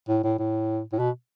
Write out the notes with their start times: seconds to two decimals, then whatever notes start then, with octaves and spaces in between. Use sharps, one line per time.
0.09 A2
0.24 A2
0.39 A2
0.92 A2
0.99 B2